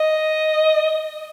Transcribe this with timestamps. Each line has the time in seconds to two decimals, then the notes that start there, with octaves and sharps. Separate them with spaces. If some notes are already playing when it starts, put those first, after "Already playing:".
Already playing: D#5